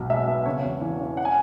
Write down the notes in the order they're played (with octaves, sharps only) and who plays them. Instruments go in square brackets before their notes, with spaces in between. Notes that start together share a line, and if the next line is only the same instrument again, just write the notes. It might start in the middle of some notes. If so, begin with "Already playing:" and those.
Already playing: [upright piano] B1 B2
G#3 E5
B3
C#3 C#5
E2
E3
C#4
F#5
G#5